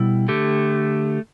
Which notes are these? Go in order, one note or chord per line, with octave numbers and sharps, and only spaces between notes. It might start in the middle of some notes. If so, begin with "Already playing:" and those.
Already playing: B2 G3 E4
D3 A3 G4